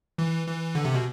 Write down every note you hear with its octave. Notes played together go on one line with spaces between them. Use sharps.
E3
E3
D3
C3
B2